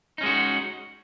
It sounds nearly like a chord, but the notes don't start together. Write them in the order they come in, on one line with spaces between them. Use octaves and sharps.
D#4 C#4 G#3 F#4